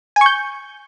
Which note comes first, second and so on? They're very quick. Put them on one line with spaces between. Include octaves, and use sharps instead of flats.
G#5 C#6 G6